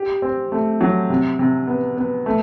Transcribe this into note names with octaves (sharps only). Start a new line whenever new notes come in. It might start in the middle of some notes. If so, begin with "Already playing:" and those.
Already playing: G4
C4
A3
F#3
C3
C3
B3
B3
A3